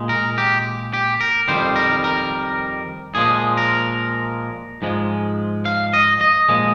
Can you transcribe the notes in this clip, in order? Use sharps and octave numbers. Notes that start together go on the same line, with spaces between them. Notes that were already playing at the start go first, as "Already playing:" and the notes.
Already playing: A#2 G#3
A#4
G4
G4
A#4
F2 D#3 G3 C5
A#4
A#4
A#2 F3 G#3 G#4
A#4
G#2 F3 G#3
F5
D#5
D#5
A#2 F3 G#3